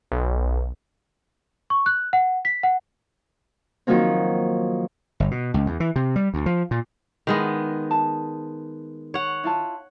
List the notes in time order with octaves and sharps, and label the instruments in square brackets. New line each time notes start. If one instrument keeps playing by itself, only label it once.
[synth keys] B1
[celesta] C#6
F#6
F#5
B6
F#5
[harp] D#3 F3 F#3 A#3 C4
[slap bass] G1
B2
C#2
E2
E3
C3
G3
D2
F3
A#2
[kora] D#3 G#3 B3 [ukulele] E4 A#4
[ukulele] A5
[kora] C#5 F#5
[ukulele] E4 F4 A5